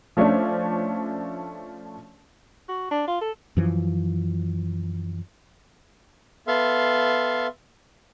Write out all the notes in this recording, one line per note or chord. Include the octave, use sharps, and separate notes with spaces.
F3 A3 C#4 D4
F#4
D4
F4
A4
F#2 E3 F3
B3 A4 E5 F5 C6